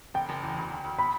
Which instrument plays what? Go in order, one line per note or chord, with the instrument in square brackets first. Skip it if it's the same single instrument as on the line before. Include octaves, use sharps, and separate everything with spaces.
[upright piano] F#1 [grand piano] G5
[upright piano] F#1
E2
D2
D2
D2
[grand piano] B5